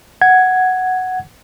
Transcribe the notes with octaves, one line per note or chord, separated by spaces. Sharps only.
F#5 G#6